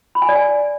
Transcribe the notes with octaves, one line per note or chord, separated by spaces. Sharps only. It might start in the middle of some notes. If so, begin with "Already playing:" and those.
B5
G#5
D5
G#5